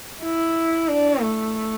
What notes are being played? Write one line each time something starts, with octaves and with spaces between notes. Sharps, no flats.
E4
D4
A3